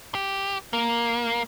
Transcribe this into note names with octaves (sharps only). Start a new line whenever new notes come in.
G4
A#3